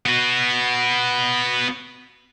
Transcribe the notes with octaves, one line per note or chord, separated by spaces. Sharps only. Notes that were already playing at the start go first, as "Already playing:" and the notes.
B3 F#4